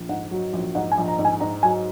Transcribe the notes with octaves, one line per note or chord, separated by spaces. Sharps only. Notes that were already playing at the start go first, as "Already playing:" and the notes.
Already playing: A#1
G#2 F#5
F#3
A#1
G#2 F#5
G#5
A#1
A#5
G#2
G#5
G#2 A#5
F#3 G#5